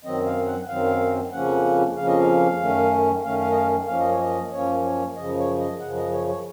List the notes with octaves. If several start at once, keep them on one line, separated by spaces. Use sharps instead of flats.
F#2 D#3 F#3 C4 D#5
F5
F#5
F#2 D#3 F#3 C4 F5
F2 C#3 F3 A#3 C#4 F#5
F2 C#3 F3 A#3 C#4 F5
D#5
F5
F#2 D#3 A3 C#4
F#2 D#3 A3 C#4 F5
F5
D#5
F5
F#2 F3 A#3 C#4 F5
D#5
C#5
D#5
F#2 F3 A#3 C#4 C#5
C#5
F#2 C#3 F3 D#5
C#5
D#5
F#2 C#3 F3 F#5
D#5
C#5
C#5